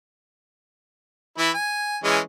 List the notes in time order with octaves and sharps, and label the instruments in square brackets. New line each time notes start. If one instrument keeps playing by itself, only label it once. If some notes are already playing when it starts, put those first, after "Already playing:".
[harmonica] E3 E4 B5
G#5
E3 G#3 C#4